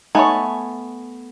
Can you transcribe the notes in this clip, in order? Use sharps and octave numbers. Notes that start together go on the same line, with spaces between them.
A3 B3 D#4 C#5 G#5 A5